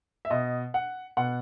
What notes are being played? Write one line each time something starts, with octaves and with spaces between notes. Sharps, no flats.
E5
B2 D#5
F#5
B2 F#5